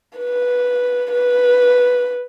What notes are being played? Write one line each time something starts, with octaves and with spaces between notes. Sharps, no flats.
B4
B4